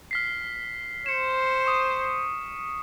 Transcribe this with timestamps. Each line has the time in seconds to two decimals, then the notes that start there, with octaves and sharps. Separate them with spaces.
0.11 F6 B6 C7
1.06 C5 C#7 E7
1.66 C#6 D#6